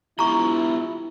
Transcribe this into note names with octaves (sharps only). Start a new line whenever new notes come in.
B3 E4 F4 G4 A#5 C#6